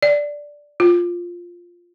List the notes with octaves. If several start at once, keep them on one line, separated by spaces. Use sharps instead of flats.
D5
F4